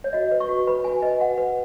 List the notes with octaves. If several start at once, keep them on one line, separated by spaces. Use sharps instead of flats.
C#5
F#4 D#5
B4
C#6
F#4
B4 B5
F#4 G#5
B4 D#5
F#4 F#5
B4